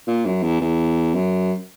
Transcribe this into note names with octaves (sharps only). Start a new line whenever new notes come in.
A#2
F#2
E2
E2
F#2